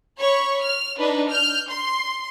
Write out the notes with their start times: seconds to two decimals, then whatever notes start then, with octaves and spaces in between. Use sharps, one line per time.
0.18 C#5 B5 C#6
0.62 F6
0.98 D4 D#4 B4
1.29 F6 G6
1.70 C6